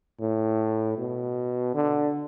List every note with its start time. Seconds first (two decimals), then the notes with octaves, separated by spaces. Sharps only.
0.20 A2
0.98 B2
1.75 D3